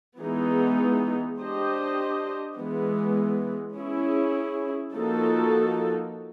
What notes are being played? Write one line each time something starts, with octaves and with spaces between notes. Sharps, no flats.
E3 G#3 B3 D#4 G#4
D4 G4 C5 D#5
E3 G#3 B3
C#4 E4 G#4
F3 A#3 D#4 F#4 A4